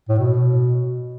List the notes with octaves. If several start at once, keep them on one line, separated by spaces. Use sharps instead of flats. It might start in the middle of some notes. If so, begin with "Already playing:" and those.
A2
B2